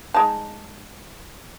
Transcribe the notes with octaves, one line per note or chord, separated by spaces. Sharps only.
G#3 D#4 A5